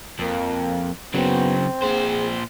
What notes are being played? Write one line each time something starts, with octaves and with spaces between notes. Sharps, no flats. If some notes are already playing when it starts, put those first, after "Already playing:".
F2 A#3
C#3 F#3 B3 C4
A#2 G#4 C5